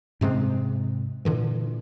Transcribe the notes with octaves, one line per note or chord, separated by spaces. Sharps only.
G#2 C3 G#3 C4
A#2 D3 E3